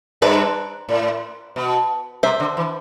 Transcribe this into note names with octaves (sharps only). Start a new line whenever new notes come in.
G2 B4 D5
A2
B2
C3 C5 E5
D3
E3